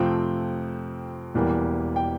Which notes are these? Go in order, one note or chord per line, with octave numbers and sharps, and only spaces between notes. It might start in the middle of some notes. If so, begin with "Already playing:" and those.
Already playing: F2 C3 F3 A3 C4 G5
E1 E2 E3 G3 A#3
G5